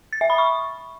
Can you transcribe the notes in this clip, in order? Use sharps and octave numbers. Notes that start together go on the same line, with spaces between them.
A6
E5
B5
C#6